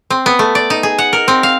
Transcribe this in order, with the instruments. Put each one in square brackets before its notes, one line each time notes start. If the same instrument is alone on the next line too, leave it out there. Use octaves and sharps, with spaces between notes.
[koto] C4
B3
A3
D5
D#4
G#4
F#5
A#4
C4
F5